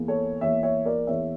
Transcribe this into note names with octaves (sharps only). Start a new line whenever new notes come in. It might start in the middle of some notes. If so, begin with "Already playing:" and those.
Already playing: E2 E3 A#3
A4 C#5
E2 E3 A#3 C#5 E5
C#5 E5
A#4 D5
E2 E3 A#3 C#5 E5